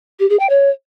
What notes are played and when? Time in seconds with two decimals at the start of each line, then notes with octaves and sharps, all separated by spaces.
0.20 G4
0.30 G#4
0.39 G5
0.49 C#5